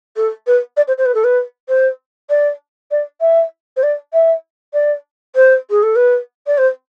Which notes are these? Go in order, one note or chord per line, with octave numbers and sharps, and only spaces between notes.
A4
B4
D5
C5
C5
B4
A4
B4
C5
D5
D5
E5
C5
D5
E5
D5
C5
G#4
A4
B4
D5
C5